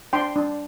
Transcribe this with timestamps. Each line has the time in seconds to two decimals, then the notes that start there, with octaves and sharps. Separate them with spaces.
0.13 D4 G5 C6
0.36 D4